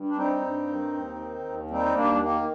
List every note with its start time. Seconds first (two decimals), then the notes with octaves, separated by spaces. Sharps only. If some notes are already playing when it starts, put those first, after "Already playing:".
Already playing: G2
0.09 D4
0.16 G3 C4 D#4
0.42 G2
0.67 D#3
0.93 D#2
1.19 D#3
1.44 D#2
1.70 G3 C4 D#4
1.95 D#2 A#3 D4
2.22 D#3 A#3